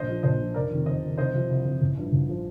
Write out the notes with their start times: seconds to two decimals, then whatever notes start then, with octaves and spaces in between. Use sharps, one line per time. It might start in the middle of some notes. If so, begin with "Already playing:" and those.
Already playing: A#1 C5 D#5
0.08 A#2 F3
0.23 A#1 C5 D#5
0.39 A#2 F3
0.54 F1 A#4 D5
0.70 F2 C3 D#3
0.86 F1 C5 D#5
1.02 F2 C3 D#3
1.18 C2 C5 D#5
1.33 C3 F3
1.50 C2
1.65 C3 F3
1.81 A1
1.97 G2 F3
2.12 A1
2.29 F3